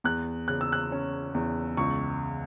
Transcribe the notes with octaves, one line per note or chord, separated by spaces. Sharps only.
E2 F#6
C#3 F#6
E6
F#6
C#4
E2
C#2 C#6